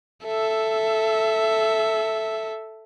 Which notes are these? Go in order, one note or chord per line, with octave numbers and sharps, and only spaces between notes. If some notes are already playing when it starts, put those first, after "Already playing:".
A4 E5